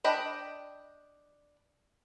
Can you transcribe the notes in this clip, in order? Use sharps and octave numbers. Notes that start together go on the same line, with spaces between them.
D4 D#5 G5 B5